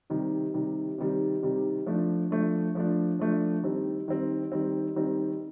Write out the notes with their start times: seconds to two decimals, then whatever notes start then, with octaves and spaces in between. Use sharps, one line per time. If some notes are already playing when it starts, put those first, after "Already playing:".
0.10 C3 D#3 G3
0.54 C3 D#3 G3
0.98 C3 D#3 G3
1.42 C3 D#3 G3
1.86 F3 A3 D4
2.31 F3 A3 D4
2.75 F3 A3 D4
3.19 F3 A3 D4
3.63 D#3 G3 C4
4.08 D#3 G3 C4
4.52 D#3 G3 C4
4.96 D#3 G3 C4